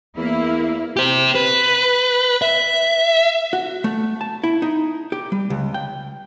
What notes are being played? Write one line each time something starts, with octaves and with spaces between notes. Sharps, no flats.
E2 A#3 E4
G4 C5
B4
E5
F#4
A3
A5
E4
D#4
G4
G3
C#2
G5